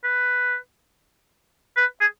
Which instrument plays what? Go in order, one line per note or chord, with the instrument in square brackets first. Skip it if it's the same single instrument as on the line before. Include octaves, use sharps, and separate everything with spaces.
[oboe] B4
B4
G#4